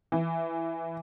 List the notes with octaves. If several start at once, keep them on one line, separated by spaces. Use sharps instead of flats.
E3